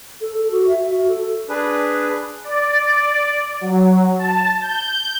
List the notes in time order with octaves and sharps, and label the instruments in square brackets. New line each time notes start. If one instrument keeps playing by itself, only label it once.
[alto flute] A4
A4
F#4
E5
F#4
A4
[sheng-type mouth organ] D4 G#4 B4
[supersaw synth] D5
F#3
A5
G6